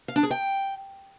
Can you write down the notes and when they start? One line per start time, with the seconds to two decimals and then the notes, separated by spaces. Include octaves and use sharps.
0.08 F5
0.16 D4
0.23 G#4
0.30 G5